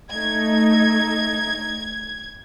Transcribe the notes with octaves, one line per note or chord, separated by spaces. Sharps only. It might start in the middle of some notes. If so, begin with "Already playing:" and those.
A3 D#4 G#6